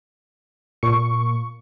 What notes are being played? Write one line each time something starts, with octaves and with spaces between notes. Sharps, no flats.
A#2 C#6